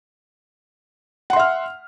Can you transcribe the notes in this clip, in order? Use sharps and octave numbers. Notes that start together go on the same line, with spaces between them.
E5 F#5 C6 F6